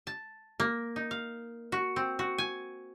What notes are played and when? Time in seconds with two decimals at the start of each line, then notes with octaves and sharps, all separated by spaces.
0.07 A5
0.60 A#3
0.96 D#4
1.11 F5
1.72 F#4
1.96 C4
2.19 F#4
2.38 G#5